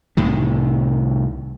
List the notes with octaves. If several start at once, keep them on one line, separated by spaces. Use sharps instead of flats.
C2 A2 C3 D#3